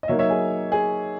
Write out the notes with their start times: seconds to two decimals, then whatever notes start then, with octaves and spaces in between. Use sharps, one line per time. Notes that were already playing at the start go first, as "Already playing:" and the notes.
0.03 D#5
0.08 F#3 A#3 D#4 C#5 E5
0.19 C#5 E5
0.30 G#4
0.72 G#4